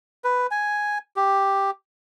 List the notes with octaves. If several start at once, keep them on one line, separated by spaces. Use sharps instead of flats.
B4
G#5
G4